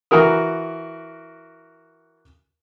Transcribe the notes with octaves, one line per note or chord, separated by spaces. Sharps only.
E3 F#4 A#4 D#6